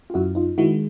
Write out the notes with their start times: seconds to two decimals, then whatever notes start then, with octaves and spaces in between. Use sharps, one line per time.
0.10 F4
0.14 F#2 E4 F#4
0.35 D#4 F4
0.58 D#3 G#3 E4 F#4